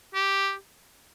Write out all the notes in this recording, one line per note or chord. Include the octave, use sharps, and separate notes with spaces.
G4